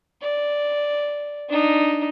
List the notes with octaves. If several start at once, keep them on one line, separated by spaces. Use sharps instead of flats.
D5
D4 D#4